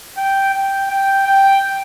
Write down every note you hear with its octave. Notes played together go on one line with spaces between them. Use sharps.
G5
G5
G5
G5